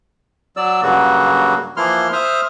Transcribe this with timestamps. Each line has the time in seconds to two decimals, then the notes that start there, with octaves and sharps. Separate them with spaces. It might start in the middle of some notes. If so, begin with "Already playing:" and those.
0.57 F#3 D5 E6
0.82 G2 C#3 F#3 A#3 F#4
1.77 E3 F3 A#3 E4 C6 F6
2.13 C5 E5 D#6 F6